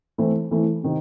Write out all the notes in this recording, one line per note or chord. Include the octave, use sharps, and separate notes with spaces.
E3 A3 C4 E4
E3 A3 C4 E4
C3 D#3